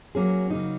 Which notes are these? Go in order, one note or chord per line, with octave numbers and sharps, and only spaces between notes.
F#3 A#3 C#4 G#4
C#3 F#3 A#3 D#4